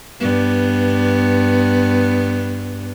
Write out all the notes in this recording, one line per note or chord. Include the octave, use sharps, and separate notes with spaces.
G2 B3